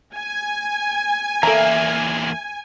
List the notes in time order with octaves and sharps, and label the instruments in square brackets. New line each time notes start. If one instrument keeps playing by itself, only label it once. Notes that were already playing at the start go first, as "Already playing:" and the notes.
[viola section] G#5
[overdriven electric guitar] E2 A#3 [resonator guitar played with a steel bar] E3 E5 [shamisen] A4 A#5